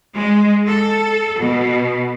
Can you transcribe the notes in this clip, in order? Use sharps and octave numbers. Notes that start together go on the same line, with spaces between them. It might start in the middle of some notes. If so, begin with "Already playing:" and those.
G#3
A4
B2